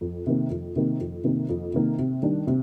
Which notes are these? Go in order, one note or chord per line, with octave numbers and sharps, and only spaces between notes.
F2
C3 D#3 A#3
F2
C3 D#3 A#3
F2
C3 D#3 A#3
F2
C3 D#3 A#3
C3
D#3 G3 D4
C3